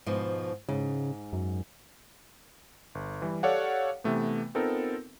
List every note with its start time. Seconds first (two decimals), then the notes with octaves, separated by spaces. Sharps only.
0.06 G#2 B2 F3
0.69 G#2 C#3
1.33 F#2
2.95 G1
3.22 E3 G3
3.43 G4 A4 C#5 D5 F5 F#5
4.04 C3 E3 A3 B3
4.55 B3 C4 D#4 F4 A4 A#4